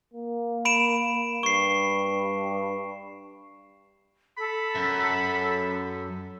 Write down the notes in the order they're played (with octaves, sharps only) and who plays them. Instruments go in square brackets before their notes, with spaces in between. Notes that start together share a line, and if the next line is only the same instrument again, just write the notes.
[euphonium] A#3
[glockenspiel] B5 D7 E7
[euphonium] G2 [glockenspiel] C#6 C7
[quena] A4 [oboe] B5
[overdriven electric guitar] F#2